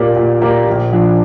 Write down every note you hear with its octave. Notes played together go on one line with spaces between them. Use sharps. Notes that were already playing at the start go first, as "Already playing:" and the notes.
Already playing: A#2 A#3 G4 A#4 D5
A#2
A#3 G4 A#4 D5
A#1
A#2 F3 D4